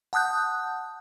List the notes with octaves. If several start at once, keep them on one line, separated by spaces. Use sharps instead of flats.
F#5 A5 D#6 F#6 G6